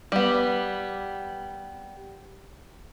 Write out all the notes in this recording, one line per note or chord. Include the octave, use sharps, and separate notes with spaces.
G3 B3